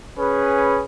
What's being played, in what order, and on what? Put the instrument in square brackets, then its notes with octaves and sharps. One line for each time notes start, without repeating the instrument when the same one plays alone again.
[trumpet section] C#4 G#4 B4